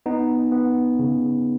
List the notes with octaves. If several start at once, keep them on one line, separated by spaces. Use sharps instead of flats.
B3 D#4
B3
C#3